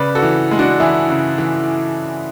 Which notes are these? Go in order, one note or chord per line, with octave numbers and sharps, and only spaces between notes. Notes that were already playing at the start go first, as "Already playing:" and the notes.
Already playing: C#3 B4 D5
F#4 A4
E3
G#3
D4 F#4
E3 E4 G#4
C#3
E3